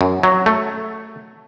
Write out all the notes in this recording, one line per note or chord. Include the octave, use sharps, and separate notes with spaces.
F#2
F#3
A3